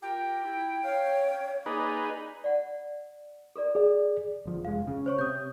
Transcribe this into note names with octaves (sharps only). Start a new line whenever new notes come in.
F4 G4 A#4 G5
E4
C#5 F5
A#3 D#4 G#4 B4 D5
D5 F#5
A4 A#4 D5
G#4 A4 D5
G1 F3
F1 G#3 F5
C#3
C5 C#5 C#6
C3 D#6 G6